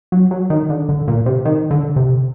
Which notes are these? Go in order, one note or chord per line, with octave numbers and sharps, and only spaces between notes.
F#3
F#3
D#3
D3
D3
A#2
C3
D#3
D3
C3